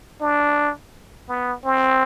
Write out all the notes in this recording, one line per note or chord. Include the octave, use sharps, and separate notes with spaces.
D4
B3
C4